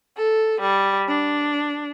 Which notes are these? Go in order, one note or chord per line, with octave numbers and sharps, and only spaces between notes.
A4
G3
D4